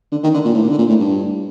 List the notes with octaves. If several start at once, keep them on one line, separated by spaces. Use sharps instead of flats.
D3
D#3
D3
A#2
A2
A#2
D3
A#2
A2
G2